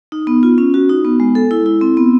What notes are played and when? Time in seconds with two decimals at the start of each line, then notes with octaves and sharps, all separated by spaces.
0.12 D#4
0.27 B3
0.43 F4
0.58 C#4
0.74 F#4
0.89 D#4
1.05 B3
1.20 G#3
1.35 A4
1.51 E4
1.66 E4
1.81 C4
1.97 B3